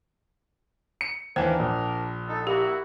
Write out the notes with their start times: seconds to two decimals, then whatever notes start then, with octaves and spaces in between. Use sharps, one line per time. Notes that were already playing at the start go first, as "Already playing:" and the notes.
1.01 C#7
1.36 D#2 E3 D4 A#4 C5 G#5
1.59 A#1
2.28 D#4 A4
2.47 A#3 E4 F#4 G4